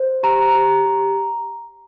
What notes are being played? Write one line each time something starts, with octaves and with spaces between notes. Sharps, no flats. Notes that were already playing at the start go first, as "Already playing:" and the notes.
Already playing: C5
G4 A#5
G4
G4